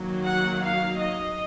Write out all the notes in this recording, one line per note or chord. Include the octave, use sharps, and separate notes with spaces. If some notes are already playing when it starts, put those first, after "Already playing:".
Already playing: D#3 F#3 A#3
F#5
F5
D#5